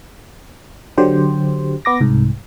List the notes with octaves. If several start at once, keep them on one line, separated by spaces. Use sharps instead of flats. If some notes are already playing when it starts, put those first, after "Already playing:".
D3 F#3 G4 C5
B3 D6 A#6
C2 G#2